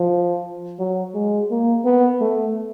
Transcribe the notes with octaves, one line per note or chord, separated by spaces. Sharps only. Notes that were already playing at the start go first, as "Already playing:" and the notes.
Already playing: F3
F#3
G#3
A#3
B3
A3